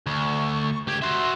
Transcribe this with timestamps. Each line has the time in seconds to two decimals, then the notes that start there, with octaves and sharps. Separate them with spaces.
0.06 D2 C#6
0.87 C#2 G4 G#6
1.02 F#4 E5 C6